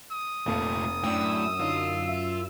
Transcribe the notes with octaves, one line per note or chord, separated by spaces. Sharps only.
D#6
F1 A#2 A3 A#3 A5
F#2 A2 D4 G5 E6
D3 D#4 F4
E5